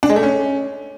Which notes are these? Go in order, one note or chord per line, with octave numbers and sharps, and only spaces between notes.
D4
G#3
A3
C#4